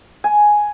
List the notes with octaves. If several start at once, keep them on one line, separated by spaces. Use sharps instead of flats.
G#5